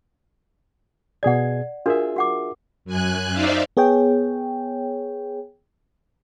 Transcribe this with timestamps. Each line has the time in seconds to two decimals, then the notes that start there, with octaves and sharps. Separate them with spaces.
1.23 B2 G#4 D5 F#5 G#6
1.86 D4 F4 F#4 G#4 A#4 E5
2.16 F#4 F#5 D6
2.85 F#2 G#5 F#6
3.31 D#4 C5 D5 E5 F5
3.77 B3 G#4 C#5 G5